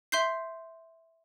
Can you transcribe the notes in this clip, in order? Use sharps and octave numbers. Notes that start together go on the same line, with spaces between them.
E5 C6 G6 C7